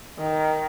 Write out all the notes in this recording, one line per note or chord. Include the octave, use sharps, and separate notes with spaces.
D#3